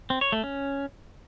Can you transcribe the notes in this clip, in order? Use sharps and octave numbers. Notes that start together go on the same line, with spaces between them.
C4
C#5
A3
C#4